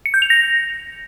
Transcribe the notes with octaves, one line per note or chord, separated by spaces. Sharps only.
C#7
G6
F7
A#6